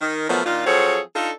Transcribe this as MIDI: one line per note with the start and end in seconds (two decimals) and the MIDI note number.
0.01 0.26 51
0.30 0.41 47
0.30 0.41 53
0.30 0.41 54
0.30 0.41 57
0.30 0.41 59
0.30 0.41 70
0.45 0.63 46
0.45 0.63 51
0.45 0.63 62
0.45 0.63 65
0.67 1.00 53
0.67 1.00 54
0.67 1.00 60
0.67 1.00 68
0.67 1.00 69
0.67 1.00 73
1.15 1.31 62
1.15 1.31 63
1.15 1.31 65
1.15 1.31 69